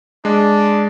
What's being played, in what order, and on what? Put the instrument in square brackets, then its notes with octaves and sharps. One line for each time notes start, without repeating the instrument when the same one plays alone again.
[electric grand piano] G#3 [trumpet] D4